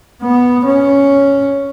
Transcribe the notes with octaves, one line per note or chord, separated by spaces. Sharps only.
B3
C#4